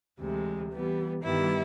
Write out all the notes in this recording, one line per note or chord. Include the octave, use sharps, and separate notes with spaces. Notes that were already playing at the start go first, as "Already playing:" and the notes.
D2 C3 E3 G#3
E3 G3 B3
G2 D#3 G3 B3 E4